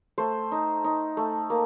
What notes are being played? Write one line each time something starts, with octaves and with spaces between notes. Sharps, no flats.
A3 C5
D#4
D#4
A3
A#3